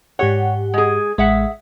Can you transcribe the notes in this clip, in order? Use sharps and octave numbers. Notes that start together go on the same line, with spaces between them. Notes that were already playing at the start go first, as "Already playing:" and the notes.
G#2 G4 C#5 F#5
G#3 G#4
A1 G#3 G#4 E5 F#5